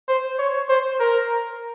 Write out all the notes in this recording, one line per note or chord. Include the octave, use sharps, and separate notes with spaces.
C5
C#5
C5
A#4